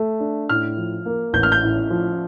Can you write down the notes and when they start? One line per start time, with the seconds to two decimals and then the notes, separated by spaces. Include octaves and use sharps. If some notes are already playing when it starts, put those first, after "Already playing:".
Already playing: A3
0.20 D4
0.49 A2 F6
0.77 F3
1.06 A#3
1.33 A1 G6
1.43 F6
1.52 G6
1.62 A2
1.90 F3